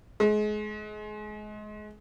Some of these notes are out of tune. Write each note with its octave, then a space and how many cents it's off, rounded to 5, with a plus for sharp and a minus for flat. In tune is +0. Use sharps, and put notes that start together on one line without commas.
G#3 +30